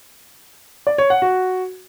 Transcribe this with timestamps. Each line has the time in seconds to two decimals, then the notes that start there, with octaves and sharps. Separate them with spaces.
0.87 D5
0.98 C#5
1.10 F#5
1.22 F#4